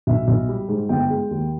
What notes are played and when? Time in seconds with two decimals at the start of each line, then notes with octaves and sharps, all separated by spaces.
0.07 B1 E5
0.28 B1
0.49 G3
0.69 G#2
0.89 G1 G5
1.10 G#3
1.31 D#2